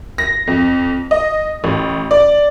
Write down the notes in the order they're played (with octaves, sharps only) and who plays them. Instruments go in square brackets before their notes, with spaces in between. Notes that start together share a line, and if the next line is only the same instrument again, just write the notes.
[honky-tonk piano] A#6
F2
D#5
A1
D5